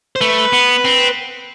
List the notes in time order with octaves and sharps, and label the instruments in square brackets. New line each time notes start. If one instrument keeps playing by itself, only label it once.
[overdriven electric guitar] C5
[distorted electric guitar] A3 [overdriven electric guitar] B4
[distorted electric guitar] B3
C4